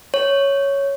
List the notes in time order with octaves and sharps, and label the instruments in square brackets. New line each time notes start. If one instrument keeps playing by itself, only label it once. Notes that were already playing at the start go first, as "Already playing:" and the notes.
[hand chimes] C#5